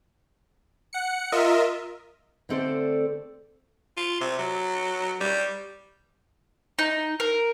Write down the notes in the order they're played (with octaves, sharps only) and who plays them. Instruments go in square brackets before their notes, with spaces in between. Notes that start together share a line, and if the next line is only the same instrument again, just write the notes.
[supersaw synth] F#5 C#7
F4 A#4 D#5 E5
[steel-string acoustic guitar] D3 A3 C4 A4 C5 D5
[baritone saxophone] F4
C3
F#3
G3
[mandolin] D#4
A#4